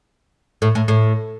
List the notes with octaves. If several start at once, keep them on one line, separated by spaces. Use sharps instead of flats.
A2
A2
A2